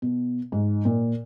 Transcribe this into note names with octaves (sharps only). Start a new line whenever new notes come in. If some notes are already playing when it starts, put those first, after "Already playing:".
B2
G#2
A#2